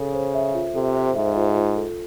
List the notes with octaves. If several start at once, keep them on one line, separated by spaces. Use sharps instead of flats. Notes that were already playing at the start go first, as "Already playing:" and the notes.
Already playing: C#3 A4
C5
E5
F4
C3 A4
C5
G#2 E5
F4
F4
A4